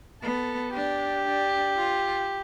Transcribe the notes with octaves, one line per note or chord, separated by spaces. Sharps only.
B3 A4
D4 G4
D4
F4